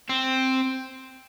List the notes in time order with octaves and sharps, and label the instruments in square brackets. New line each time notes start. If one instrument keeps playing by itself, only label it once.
[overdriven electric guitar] C4